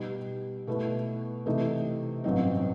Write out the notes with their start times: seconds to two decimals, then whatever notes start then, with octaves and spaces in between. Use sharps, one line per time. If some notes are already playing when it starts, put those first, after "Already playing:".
Already playing: B2 G3 D#4 G4 B4
0.67 B2 A3 E4 B4
1.46 C3 E3 A3 D#4
2.24 A1 G2 F#3 C4 D#4